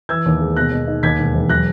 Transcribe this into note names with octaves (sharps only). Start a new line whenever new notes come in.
E3 E6 G#6
D#2
G#3
B2 F#6 A#6
B2
D#4
D#2 G#6 B6
E1
E1
F#3 F#6 A#6